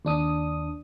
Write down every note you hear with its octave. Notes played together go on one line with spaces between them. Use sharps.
D#2 D4 D#6